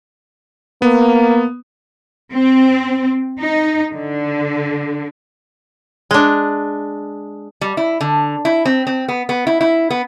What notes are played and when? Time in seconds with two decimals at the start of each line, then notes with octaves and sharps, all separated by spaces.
0.82 A#3 B3
2.33 C4
3.41 D#4
3.94 D3
6.11 G#3 D4
7.61 G3
7.77 E4
8.01 D3
8.45 E4
8.65 C4
8.87 C4
9.08 B3
9.29 B3
9.47 E4
9.61 E4
9.90 B3